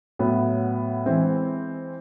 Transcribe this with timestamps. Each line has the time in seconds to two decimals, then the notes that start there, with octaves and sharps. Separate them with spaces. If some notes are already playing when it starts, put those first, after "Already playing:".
0.19 A2 F#3 B3
1.06 E3 G#3 C4 E4